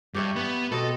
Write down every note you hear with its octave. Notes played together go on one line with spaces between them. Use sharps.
G2 G4 C#5 E5
B3
B2 C4 A4 D#5